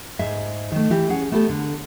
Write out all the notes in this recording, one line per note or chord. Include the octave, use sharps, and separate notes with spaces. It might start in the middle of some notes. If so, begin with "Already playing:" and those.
G#2 G#4 E5
D#3 A3
E3 E4 G4
C#4 G#4 F#5
A3 B3 G4 A4
D3